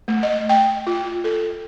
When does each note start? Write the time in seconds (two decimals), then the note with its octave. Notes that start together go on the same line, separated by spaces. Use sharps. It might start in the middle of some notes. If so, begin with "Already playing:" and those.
0.08 A3
0.23 D#5
0.49 G5
0.87 F4
1.24 A4